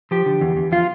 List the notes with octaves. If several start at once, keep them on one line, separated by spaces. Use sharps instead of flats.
F3 G4
D3
E2
E2
F3 F4